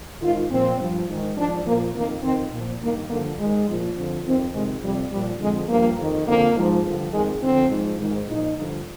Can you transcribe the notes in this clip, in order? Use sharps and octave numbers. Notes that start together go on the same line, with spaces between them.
G#2 D#3 F4
A#2 F3 C4
G2 F3
G#2 D#3
G#2 F3 D4
A#2 F3 A#3
F2 D#3 A#3
F2 D#3 C4
A#2 F3
G2 D#3 A#3
G2 D3 F3 A#3
G#2 D#3 G#3
A#2 F3
F2 D3 F3
F2 D#3 C4
F2 C3 D#3 G#3
F2 C3 F3 G3
A#2 F3 G3
F2 D3 F3 G#3
G2 F3 A#3
F2 D#3
F2 D3 F3 A#3
G#2 F3
G2 D3 F3
F2 D#3 G#3
F2 D3 F3 C4
G#2 F3
G#2 D#3
A#2 F3 D#4
G2 D3 F3